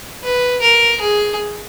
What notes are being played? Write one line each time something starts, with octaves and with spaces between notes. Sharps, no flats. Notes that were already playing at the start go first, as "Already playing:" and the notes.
B4
A#4
G#4